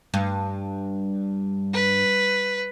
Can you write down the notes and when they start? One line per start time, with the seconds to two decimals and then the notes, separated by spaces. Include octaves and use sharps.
0.14 G2
1.74 B4